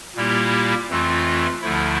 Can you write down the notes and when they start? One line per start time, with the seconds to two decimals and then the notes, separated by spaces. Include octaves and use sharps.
0.16 A#2 G3 A#3 E4 G4
0.90 F2 E3 A3 C4 F4
1.62 D2 D3 F3 A3 E4